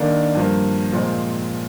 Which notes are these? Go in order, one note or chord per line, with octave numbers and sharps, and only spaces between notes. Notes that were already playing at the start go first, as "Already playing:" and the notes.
Already playing: D#3 A#3 D4
G2 F3 A#3
A#2 F3 G#3 C4